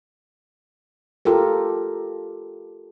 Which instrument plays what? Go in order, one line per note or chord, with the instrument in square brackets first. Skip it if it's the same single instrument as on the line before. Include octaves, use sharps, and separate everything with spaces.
[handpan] F4 G4 A4 A#4